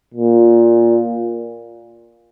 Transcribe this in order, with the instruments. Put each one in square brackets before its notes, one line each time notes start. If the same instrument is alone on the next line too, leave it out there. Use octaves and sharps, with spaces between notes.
[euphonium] A#2